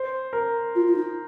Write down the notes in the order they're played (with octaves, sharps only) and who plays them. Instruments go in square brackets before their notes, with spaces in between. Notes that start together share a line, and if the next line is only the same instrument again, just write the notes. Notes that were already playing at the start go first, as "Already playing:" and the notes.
Already playing: [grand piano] C5
A#4
[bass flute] F4
F4
D#4